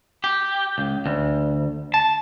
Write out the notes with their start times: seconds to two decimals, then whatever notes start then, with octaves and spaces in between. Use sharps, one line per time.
0.24 G4
0.78 C#2
1.06 D2
1.94 A5